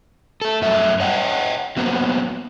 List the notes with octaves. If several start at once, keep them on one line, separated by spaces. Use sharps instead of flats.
A3 A4
F#2 G3 A3 E5
C#5 D#5 F#5 G5
F#3 A#3 B3 C5